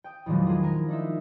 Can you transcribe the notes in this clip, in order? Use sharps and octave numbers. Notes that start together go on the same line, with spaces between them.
G5 D#6
E2 A#2 D#3 F3 F#3 G#3
G#3 A#3 F4 G#4
A#4
D4 D#4 E5